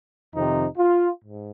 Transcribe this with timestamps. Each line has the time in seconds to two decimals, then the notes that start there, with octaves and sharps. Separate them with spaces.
0.34 F2 C3 D#3 D#4
0.78 F4
1.23 G#2